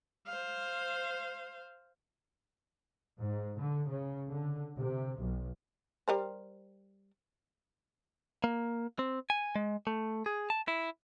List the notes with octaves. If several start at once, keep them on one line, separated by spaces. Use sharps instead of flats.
C5 F5
G#2
D3
C#3
D3
C3
B1
G3 A#4 C5
A#3
C4
G#5
G#3
A3
G#4
A5
E4